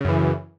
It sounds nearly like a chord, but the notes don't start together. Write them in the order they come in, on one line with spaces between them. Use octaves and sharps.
C#3 F#2 E3